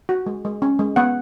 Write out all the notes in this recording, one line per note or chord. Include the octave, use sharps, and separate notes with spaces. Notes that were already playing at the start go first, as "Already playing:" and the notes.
F#4
G#3
G#3
C#4
G#3
B3 F#5